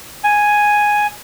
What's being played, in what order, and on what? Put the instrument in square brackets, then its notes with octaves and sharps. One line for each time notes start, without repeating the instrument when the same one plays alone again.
[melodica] G#5